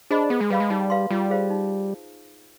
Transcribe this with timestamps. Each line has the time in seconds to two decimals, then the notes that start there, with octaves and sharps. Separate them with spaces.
0.11 D4 G#4 C5 D#5 B5
0.30 B3 G#4
0.41 G#3
0.50 G3 B4 F5 B5
0.60 G#3
0.70 G3 D#4
0.90 B4 F5 C6
1.10 G3 F4
1.30 G#4 C5 F5
1.50 D#4